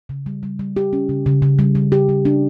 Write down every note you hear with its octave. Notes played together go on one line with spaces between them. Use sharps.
C#3
G3
G3
G3
G4
C#4
C#3
C#3
C#3
G3
G3
G4
G3
D4